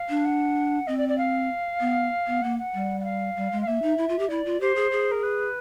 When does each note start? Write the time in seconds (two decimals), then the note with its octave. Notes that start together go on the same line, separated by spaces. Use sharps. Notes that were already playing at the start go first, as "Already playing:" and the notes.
Already playing: F5
0.09 D4
0.25 F#5
0.87 C4 D#5
0.98 D5
1.09 D5
1.18 F5
1.80 B3
2.27 B3
2.42 A#3 F#5
2.59 F#5
2.74 G3
3.00 F#5
3.04 F5
3.36 G3
3.52 G#3
3.62 F5
3.67 A#3 E5
3.82 D#4
3.98 E4
4.09 F4
4.19 G4
4.29 E4 D5
4.45 F4
4.60 G4 C5
4.76 G#4
4.91 G#4
5.11 A#4
5.23 B4